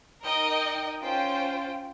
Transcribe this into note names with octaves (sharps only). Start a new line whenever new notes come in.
D#4 A#4 D#5 G5
C#4 F4 C5 G5